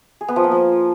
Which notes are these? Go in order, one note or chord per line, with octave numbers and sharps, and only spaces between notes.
G#4
B3
F3
A#3
F3